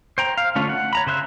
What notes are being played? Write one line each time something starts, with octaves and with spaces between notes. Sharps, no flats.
C5 G5 A#5
F5
D3 A3 C#4 F4
F#5
C#5 A#5 B5
C#3 C5 E5 F#6